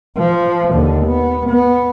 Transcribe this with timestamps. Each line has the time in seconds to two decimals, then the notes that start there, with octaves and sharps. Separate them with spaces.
0.18 F3
0.73 D#2 D3
1.06 B3
1.50 B3